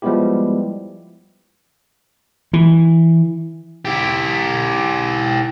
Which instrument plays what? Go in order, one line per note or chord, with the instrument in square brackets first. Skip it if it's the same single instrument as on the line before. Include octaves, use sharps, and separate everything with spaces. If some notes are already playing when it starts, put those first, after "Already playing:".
[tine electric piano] F3 G3 G#3 B3 E4 G4
[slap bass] E3
[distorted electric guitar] E4 G4